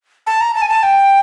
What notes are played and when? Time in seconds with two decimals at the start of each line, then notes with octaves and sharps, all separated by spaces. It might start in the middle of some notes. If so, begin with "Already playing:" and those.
0.27 A5
0.41 A#5
0.55 A5
0.62 G#5
0.69 A5
0.83 G5